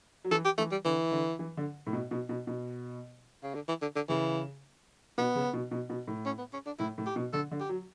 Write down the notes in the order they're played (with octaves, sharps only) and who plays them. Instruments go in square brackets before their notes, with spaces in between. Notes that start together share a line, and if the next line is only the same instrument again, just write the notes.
[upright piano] F#3
[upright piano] E3 [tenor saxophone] A4
[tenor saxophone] G4
[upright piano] E3 [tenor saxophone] A3
[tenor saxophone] G3
[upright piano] D3 [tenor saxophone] E3
[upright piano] D3
E3
D3
A2
B2
B2
B2
B2
[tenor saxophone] C#3
D3
E3
D3
D3
[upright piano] C#3 [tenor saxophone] E3
[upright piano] B2 [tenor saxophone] B3
[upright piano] C#3
B2
B2
B2
A2
[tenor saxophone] C#4
B3
C#4
D4
[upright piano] A2 [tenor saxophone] E4
[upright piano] A2
[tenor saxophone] G4
[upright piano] B2
[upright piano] D3 [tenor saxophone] A4
[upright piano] D3
[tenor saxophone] G4
[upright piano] F#3